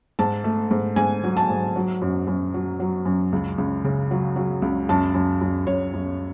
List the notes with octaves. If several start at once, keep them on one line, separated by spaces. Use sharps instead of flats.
G#2 A5
A3
G#2
G#2 G#5
F#3
A5
G#2
F#3
F#2
F#2
F#3
F#3
F#2
C#2
C#2
C#3
F#3
F#3
C#2
F#2 A5
F#2
F#2
F#2 C#5
F#2